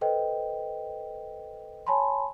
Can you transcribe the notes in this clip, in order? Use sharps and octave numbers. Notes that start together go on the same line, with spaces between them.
A4 B4 C5 D#5 G5
C#5 G#5 A5 B5 C6